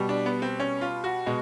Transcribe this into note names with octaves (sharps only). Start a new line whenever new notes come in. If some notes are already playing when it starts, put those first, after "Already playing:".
Already playing: B2 G3
D4
B3
C4
C#4
F4
F#4
B2 G#3